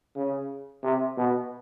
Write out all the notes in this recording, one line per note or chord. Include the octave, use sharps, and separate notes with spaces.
C#3
C3
B2